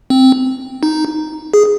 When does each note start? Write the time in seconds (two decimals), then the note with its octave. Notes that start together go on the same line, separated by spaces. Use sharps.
0.10 C4
0.83 D#4
1.54 G#4